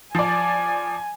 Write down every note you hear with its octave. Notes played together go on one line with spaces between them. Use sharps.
F3 D5 G#5